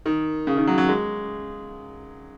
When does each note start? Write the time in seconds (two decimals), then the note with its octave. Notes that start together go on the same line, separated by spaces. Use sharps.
0.06 D#3
0.47 C#3
0.57 D#3
0.67 F#3
0.78 F#3
0.89 G#3